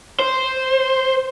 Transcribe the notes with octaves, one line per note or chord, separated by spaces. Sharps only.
C5